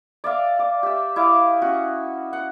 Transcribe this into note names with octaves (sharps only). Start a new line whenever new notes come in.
D5 E5 F5
D5
G4 E5
E4 D#5 F5 D6
C#4 F#4
F#5